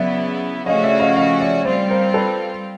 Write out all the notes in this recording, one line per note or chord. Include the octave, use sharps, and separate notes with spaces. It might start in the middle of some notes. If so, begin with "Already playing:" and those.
Already playing: C#3 F#3 B3 E4 D5 E5
C#3 F3 A3 C#4 F#4 D#5 F5
D5 E5
D#5 F5
D#5 F5
D5 E5
G3 C4 F4 C5 D5
A#4 C5
A4 B4